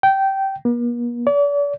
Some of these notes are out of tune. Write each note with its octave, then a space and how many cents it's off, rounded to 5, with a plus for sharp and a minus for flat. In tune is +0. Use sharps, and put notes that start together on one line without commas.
G5 -15
A#3 +45
D5 -40